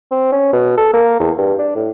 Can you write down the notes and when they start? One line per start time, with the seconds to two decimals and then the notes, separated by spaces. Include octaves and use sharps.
0.11 C4
0.32 C#4
0.53 B2
0.77 A4
0.94 A#3
1.20 E2
1.38 G2
1.59 D4
1.75 A2